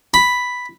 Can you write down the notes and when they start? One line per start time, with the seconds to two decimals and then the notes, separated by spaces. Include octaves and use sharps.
0.14 B5